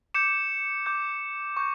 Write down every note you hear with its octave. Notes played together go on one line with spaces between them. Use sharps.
D6 G6 C#7 E7
D6 G6
C#6 G6